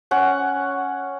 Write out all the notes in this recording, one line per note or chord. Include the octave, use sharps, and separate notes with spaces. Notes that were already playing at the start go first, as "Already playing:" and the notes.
C#4 F#5